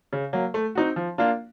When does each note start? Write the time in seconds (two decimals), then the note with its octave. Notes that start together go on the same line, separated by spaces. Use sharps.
0.13 C#3
0.33 F#3 A#3
0.54 A3
0.75 C4 D#4 F#4
0.96 F3
1.18 A#3 D4 F4